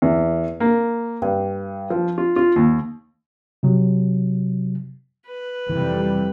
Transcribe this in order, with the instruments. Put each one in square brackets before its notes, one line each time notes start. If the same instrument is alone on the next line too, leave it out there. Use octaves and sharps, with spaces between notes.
[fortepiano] E2
A#3
G2
F3
F4
F4
D#2
[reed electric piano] C3 F#3
[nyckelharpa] B4
[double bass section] F2 C3 G3 [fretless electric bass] E3